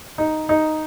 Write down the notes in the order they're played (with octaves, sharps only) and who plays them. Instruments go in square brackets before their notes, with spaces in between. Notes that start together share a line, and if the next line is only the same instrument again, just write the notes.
[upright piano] D#4
D#4